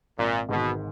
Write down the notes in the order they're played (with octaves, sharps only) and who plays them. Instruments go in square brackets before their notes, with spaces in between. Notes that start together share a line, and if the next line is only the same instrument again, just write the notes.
[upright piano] G#1 [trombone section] A#2
[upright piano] G#2 D#3 [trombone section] B2